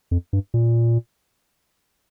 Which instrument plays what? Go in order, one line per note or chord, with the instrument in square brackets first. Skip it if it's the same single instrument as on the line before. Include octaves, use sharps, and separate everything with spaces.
[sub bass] F2
G2
A#2